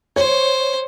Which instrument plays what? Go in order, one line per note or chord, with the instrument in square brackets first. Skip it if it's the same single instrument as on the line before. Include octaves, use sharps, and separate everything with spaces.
[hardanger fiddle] C5 [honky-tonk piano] C#5